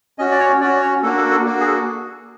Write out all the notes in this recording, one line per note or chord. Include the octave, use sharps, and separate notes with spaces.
C#4 F#4 D#5
D5
C#5
C#4 F#4 D5
C#5
A#3 D4 F#4 A4
A4
A4
A#3 D4 F#4
G#4
A4